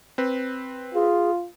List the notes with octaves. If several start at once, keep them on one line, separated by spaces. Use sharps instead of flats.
C4 B4
F4 G#4